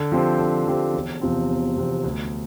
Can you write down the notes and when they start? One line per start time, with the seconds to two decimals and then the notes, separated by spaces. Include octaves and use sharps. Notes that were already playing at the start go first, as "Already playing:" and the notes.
Already playing: D3
0.12 F3 C4 G4 C5
0.39 D3
0.67 F3 C4 G4 C5
0.94 E1
1.21 E2 C3 F3 C4
1.49 E1
1.76 E2 C3 F3 C4
2.04 D2